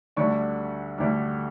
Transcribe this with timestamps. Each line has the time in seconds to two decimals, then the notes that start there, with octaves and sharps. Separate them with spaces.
0.16 D2 D3 G3 D4 C#6
0.98 D2 D3 G3 D4